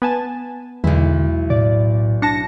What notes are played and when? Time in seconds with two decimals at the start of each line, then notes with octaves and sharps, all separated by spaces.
0.02 B3 B4 G#5 A5
0.84 B1 E2 D3 G#3 E4
1.50 A2 D5
2.22 D4 A5 A#6 C#7